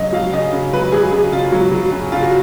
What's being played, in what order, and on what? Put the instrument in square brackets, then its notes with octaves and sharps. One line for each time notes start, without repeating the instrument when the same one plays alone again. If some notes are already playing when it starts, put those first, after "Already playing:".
Already playing: [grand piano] C#3 F#3 D#5
F#3 F5
C#3 D#5
C#3
F#3 B4
F#3 G#4
C#3 G#4
C#3 F4
F#3
F#3
C#3
C#3 F4
F#4